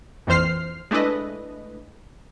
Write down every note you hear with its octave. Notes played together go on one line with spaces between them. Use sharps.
A#1 F2 E3 C5 F6 C7
G#3 A3 D4 E4 B4 D#5